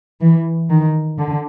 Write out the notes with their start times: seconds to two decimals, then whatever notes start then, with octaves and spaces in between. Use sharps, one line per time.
0.22 E3
0.70 D#3
1.18 D3